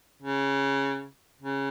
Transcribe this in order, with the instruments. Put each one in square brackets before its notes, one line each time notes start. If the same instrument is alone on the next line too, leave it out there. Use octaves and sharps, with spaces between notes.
[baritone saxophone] C#3
C#3